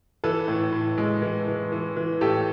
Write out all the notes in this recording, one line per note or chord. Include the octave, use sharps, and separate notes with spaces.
E3 A4 B4
A2
A2
G#3
E3
E3
E3
E3
A2 G4 A4